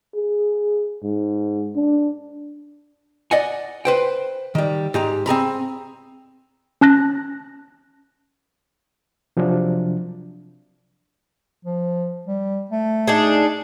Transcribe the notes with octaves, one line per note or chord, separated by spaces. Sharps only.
G#4
G#2
D4
D5 D#5 F#5 G#5
B4 C5 G5
D#3 G3
G#2 G4 A#5
C4 G#4 A#5 B5
C#4 A5 F#6 A#6
C3 F3 F#3 D4
F3
G3
A3
D4 D#4 G#4